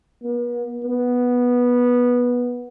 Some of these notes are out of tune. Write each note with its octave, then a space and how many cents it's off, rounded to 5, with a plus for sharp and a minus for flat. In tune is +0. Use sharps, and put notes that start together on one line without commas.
B3 -45
B3 -10